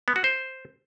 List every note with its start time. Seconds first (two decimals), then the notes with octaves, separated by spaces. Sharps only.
0.08 B3
0.16 F#4
0.24 C5